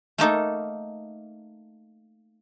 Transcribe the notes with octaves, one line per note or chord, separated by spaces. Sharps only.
A3 A#3 D#4 A4